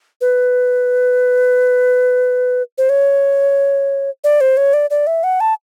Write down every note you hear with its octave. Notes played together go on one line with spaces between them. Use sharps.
B4
C5
C#5
D5
C5
C#5
D5
D5
E5
F#5
A5